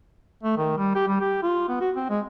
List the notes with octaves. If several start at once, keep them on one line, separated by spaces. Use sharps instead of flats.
A3
D#3
G3
G4
G3
G4
F4
B3
F#4
C4
G#3